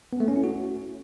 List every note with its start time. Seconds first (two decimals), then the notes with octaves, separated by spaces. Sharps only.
0.13 B3
0.20 A3
0.28 C#4
0.36 E4
0.44 F#4